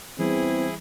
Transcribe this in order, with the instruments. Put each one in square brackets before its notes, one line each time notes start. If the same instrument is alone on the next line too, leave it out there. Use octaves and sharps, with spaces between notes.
[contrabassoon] E2 [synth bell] E3 G3 [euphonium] C4 [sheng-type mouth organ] E4 G#4